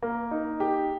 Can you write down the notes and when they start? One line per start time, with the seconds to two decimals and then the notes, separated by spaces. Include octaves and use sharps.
0.02 A#3
0.31 D#4
0.60 G4